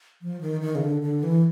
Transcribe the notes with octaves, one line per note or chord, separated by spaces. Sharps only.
F3
D#3
D#3
C#3
D3
D3
E3